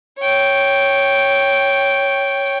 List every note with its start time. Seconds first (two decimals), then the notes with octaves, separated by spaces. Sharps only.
0.20 C#5 G5